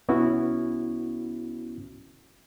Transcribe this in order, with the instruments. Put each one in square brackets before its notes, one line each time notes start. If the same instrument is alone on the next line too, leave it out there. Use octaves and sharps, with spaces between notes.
[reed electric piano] C2 B3 C#4 E4 F#4